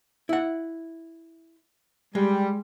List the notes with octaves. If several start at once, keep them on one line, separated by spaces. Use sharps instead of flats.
E4 F#5
G3 G#3